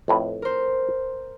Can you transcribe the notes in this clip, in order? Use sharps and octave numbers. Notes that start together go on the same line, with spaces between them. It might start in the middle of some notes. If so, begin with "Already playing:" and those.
F2 A2 B4
A#4 C5